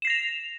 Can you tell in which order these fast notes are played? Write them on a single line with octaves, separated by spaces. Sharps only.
E7 C7 A#6 F7